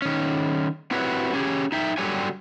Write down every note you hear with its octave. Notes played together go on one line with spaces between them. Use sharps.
D#3 C#4
C4 E4 F#4 G4 B4 C#5
C#4 G4 G#4
D#4 E5 G5
D3 F#3 G3 G4 C#5 G#5